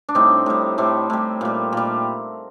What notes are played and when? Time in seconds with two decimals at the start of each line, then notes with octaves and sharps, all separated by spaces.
0.09 D4
0.15 A2 G3 C4 D#4
0.46 A2 G3
0.78 A2 G3 A3 C4
1.10 A2 G3
1.41 A#2 G3
1.73 A#2 G3